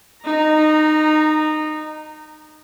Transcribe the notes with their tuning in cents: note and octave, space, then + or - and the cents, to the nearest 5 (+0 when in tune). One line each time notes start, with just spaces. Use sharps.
D#4 -20 A#5 +0